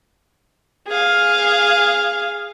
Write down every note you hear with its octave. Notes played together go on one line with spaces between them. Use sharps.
G#4 F5